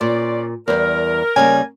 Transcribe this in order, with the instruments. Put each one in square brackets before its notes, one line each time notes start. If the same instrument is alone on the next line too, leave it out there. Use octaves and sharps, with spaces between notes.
[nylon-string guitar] A#2 [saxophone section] C#4 C5 D5
[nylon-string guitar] E2 G3 [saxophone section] A#4
[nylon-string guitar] C#3 G3 A#3 [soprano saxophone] G#5